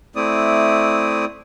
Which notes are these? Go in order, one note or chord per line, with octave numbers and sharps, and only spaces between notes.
A3 C4 E4 D5 D#6